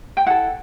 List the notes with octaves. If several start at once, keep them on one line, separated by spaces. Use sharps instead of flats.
G5
E4 A4 F#5